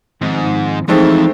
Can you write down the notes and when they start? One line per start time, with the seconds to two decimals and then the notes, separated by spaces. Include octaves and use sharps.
0.21 G#2 D#3 F3 C4
0.88 F2 E3 G#3 A3 C4 D#4 E4